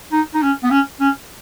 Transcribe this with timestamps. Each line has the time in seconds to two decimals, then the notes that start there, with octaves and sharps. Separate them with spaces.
0.12 D#4
0.34 D#4
0.42 C#4
0.63 B3
0.71 C#4
1.00 C#4